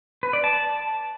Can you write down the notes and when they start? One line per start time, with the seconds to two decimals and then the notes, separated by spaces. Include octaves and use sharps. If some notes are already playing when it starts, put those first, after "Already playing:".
0.23 B4
0.33 D5
0.44 A5